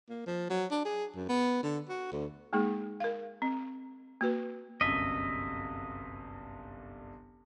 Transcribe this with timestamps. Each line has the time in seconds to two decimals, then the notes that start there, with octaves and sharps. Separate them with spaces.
0.09 A#3
0.27 F3
0.50 F#3
0.71 D4
0.85 G#4
1.16 F#2
1.29 B3
1.63 D3
1.89 F#4
2.12 D2
2.53 G#3 A#3 D#4 G#4
3.00 A#4 F5
3.42 C4
4.21 A#3 F#4 B4
4.81 G1 C2 F#2 D#5 E5